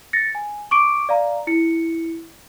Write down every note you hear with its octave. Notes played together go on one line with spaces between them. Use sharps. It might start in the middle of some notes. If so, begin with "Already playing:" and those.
A6 A#6 C#7
G#5
C#6 D6 D7
D5 F5 A#5
E4 C#7